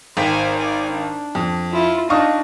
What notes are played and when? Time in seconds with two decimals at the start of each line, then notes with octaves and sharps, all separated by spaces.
0.17 G#1 C5 G5 G#5 B6
0.56 D5 G#5
0.91 D4
1.35 F2
1.72 E4 F4
2.10 D4 D#4 F5 C#6 D#6